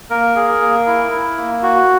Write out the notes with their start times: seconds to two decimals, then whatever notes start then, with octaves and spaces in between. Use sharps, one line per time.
0.10 A#3 A#4
0.36 G#4
0.61 A#3
0.87 E4
1.11 E4
1.38 A#3
1.63 F#4